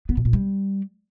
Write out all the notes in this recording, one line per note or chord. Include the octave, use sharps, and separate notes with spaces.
B3
B2
A#2
G3